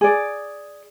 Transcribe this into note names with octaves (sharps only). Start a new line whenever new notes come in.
G#4 D5